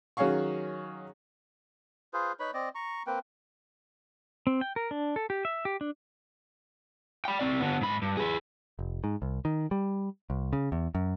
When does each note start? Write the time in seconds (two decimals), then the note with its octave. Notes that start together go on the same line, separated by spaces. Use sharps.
0.17 D#3 F#3 C#4 G#4 F5 C#6
2.13 F4 G#4 B4 C5
2.40 D#4 B4 C#5 B5
2.54 C4 D5 D#5
2.75 A#5 C#6
3.07 A#3 C4 B4 G5
4.47 C4
4.61 G5
4.76 A#4
4.91 D4
5.16 A4
5.30 G4
5.45 E5
5.65 G4
5.81 D4
7.25 G5 B5
7.39 C4 D5
7.60 D3 B3
7.81 G#2 B5
8.02 G2
8.17 G#4 B4
8.79 F1
9.04 G#2
9.22 C2
9.45 D#3
9.71 G3
10.30 C2
10.53 C#3
10.72 E2
10.95 F#2